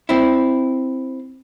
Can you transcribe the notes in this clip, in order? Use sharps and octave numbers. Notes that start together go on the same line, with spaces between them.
C4 E4